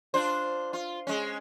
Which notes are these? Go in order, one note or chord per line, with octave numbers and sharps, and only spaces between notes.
D4 F4 C5
F4
G#3 C#4